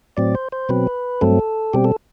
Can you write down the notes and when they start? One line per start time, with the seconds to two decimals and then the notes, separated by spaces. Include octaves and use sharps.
0.17 A2 F#3 C4 D5
0.35 C5
0.52 C5
0.69 B2 F#3 C4 B4
1.21 G2 F#3 A3 C4 A4
1.73 B2 G3 C4 G4
1.84 A4